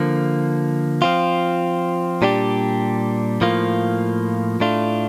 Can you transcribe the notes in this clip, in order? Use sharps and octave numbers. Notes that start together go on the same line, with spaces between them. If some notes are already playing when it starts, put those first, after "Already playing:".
Already playing: D3 F3 A#3
F3 C4 F4
A#2 G3 D4 G4
A2 F3 A#3 F4
A2 A3 D4 F4